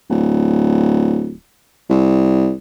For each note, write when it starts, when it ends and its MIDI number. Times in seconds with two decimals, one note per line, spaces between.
0.10 1.34 26
1.89 2.53 36